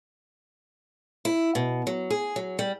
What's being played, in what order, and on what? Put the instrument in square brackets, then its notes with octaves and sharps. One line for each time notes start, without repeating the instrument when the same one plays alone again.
[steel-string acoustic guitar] E4
B2
F#3
G#4
F#3
G3